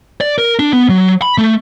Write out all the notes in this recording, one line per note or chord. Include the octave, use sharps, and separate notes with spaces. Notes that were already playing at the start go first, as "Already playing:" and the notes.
D5
A#4
D4
B3
F#3
B5
A3